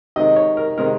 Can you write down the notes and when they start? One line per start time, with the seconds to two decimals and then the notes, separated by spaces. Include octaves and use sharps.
0.16 C3 D#3 G#3 D#4 D#5
0.36 C#5
0.57 A#4
0.78 C3 D#3 G#3 D#4 A#4